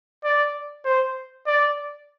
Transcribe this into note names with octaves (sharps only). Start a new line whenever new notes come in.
D5
C5
D5